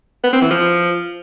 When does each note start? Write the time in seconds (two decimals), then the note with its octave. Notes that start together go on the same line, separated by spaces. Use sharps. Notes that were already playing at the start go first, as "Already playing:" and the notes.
0.24 B3
0.33 C4
0.42 E3
0.51 F3